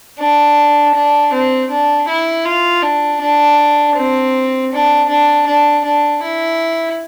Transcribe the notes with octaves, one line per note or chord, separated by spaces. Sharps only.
D4
D4
C4
D4
E4
F4
D4
D4
C4
D4
D4
D4
D4
E4